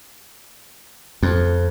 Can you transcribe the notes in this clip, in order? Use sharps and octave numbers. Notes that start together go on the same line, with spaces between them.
F2